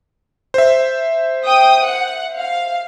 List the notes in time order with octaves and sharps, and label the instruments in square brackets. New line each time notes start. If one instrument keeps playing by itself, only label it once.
[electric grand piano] C5 E5
[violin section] G5 D#6
F#5
F5